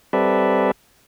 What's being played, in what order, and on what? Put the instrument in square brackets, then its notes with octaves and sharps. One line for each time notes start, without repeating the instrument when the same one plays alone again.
[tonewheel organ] G3 C4 A4 B4 D5 E5